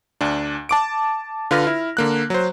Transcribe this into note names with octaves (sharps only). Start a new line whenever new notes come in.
D2 D4
A5 D6 D7
D3 F4 B4 F6 A#6
E4
D3 A#3 F#6
F#3 C5